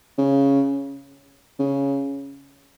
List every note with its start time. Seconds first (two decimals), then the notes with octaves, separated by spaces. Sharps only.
0.18 C#3
1.59 C#3